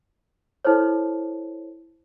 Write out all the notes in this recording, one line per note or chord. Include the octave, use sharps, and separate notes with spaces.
E4 A4 C5 C#5